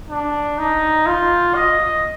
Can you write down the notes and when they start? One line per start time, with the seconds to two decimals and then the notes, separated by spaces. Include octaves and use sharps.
0.09 D4
0.58 D#4
1.07 F4
1.55 D#5